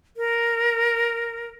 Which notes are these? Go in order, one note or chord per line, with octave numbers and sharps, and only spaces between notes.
A#4